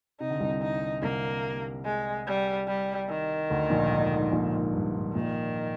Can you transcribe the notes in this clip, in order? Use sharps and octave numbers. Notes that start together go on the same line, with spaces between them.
C3 D#4
D3
C2 C3
D#4
C2 C3 A#3
G#3
G3
G3
D#3
D2 D3
A#1 A#2
G#2
G#2
A#1 A#2
G#2
G2
G#2
A#1 A#2 D#3